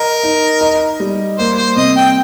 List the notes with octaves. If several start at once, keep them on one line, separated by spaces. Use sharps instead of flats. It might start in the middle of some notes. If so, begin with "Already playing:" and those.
Already playing: A#4 D#5
D#4
D#5
G3
A#3 C5
C5
C3 D#5
G5